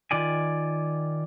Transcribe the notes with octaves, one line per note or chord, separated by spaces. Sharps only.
D#3 F4 D5 G#5